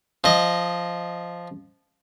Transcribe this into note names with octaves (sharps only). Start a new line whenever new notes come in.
F3 D#5